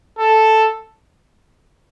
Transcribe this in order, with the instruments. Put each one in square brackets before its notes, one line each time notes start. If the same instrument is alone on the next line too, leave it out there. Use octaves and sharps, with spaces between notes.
[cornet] A4